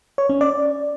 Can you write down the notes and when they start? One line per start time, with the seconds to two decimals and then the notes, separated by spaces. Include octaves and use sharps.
0.18 C#5
0.29 C#4
0.41 D5